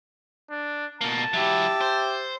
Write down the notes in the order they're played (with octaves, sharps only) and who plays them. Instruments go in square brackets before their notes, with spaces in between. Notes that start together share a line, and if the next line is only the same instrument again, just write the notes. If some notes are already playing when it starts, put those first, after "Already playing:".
[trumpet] D4
[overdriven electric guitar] B2 A#3 [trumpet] A5
[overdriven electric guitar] F#3 E4 [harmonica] G4 E5
[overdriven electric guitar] C5